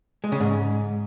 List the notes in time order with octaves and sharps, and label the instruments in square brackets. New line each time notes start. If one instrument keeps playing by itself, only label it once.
[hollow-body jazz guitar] G#3
C#3
G#2